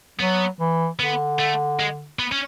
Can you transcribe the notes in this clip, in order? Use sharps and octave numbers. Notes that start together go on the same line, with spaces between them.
F#3 B3
E3
D3 B3
A3
G#3
B3
C#4